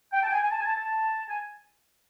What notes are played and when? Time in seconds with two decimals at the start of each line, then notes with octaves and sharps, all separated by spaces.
0.13 G5
0.23 A5
0.28 G5
0.32 G#5
0.42 G#5
0.51 A5
0.60 G#5
0.64 A5
0.77 A5
1.28 G#5